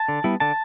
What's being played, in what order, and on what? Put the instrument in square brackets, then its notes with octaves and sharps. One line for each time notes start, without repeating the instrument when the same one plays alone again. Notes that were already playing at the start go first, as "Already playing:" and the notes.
Already playing: [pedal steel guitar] A5
D3
G3 B3 E4
D3 A5